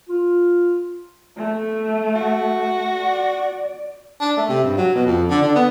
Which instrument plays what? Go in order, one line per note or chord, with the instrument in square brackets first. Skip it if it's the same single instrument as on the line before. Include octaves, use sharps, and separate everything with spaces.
[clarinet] F4
[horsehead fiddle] A3
[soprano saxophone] F#4
[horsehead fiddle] D5
[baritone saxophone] D4
A3
C3
G2
F#3
B2
F2
D3
D3
B3